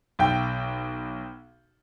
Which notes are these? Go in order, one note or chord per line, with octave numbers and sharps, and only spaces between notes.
B1 G5